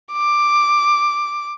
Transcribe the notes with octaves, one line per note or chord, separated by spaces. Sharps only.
D6